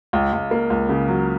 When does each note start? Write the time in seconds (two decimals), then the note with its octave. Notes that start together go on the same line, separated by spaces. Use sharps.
0.13 C#2
0.33 C#2
0.51 A#3
0.70 C#2
0.89 C#3
1.08 F#3